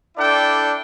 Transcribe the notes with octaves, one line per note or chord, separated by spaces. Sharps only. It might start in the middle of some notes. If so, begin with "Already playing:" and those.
D4 E4 A4 D5 G5